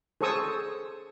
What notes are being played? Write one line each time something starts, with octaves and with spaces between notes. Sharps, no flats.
G#4 A4 C5 C#6 D#6 E6